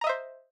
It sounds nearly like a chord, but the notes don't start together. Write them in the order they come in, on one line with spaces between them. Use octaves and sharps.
A#5 D#5 E5 C5